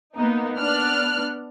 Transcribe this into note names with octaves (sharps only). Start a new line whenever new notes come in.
A#3 B3 D#4
B3 D4 F6 F#6